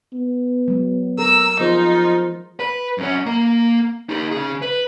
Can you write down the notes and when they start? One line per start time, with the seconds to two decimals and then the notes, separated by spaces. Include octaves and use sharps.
0.13 B3
0.68 F#3 G#3
1.18 A4 A#4 A#5 E6
1.60 F3 B3 D#4 F4 G#4 C5
2.60 B4
2.98 F#2 C#4
3.26 A#3 A#5
4.09 D#4 G4
4.32 C#3 G#4
4.62 B4